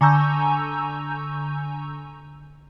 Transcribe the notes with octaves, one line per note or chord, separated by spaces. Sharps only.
D3 G#5 A#5 C#6 E6 G6